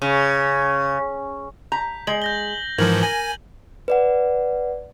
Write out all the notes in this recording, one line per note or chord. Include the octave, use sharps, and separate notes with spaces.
C#3
A#5 G6 B6
G#3 F#7
G6 A#6 G7
G#2 E3 F3 A#4 G#6 F#7
G#5 G#6 A#6 F#7
B4 D5 F#5